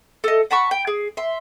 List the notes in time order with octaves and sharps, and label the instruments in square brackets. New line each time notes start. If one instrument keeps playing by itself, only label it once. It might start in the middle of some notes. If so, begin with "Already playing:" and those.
[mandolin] A4 D#5
F#5 A5 B5 C#6
G5
G#4
E5 C6